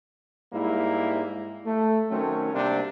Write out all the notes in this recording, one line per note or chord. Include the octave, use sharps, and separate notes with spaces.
G#2 G3 A#3 E4
A3
D#3 F#3 A3 C4 C#4
C3 G3 A#3 C4 D4